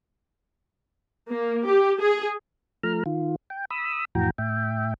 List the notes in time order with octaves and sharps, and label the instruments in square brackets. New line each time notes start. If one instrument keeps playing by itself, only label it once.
[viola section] A#3
G4
G#4
[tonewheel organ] F3 A3 A#5 F6
D#3 F4
G5
B5 D#6 E6
F2 A2 E3 F#4 G5 A#5
A2 E5 G5